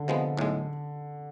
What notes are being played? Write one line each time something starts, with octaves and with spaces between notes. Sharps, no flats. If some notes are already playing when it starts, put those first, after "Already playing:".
Already playing: D3
C3 F3 G#3 B3
B1 A2 G#3